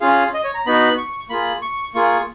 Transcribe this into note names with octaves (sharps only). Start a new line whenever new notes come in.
C#4 F4 G#4 F5
D#5
C#5
A#5
B3 D#4 F#4 B5
C#6
A#3 F4 G#4 B5
C#6
A#3 F4 G#4 C#6